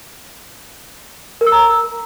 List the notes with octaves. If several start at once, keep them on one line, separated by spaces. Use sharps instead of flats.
A#4
E6
A#5